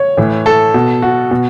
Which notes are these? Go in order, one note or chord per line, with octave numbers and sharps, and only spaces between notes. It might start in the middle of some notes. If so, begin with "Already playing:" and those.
Already playing: C#5
A2 E3
A4
B2
F#4
B2